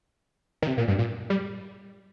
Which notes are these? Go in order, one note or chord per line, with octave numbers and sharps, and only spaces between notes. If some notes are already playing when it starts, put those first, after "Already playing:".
D#3
C3
A#2
G2
A#2
G3